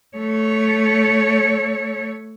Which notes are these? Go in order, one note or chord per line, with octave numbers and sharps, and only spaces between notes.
A3 C#5